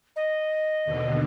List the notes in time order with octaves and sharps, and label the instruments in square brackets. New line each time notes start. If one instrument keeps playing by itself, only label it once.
[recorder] D#5
[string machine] D#2 B2 D3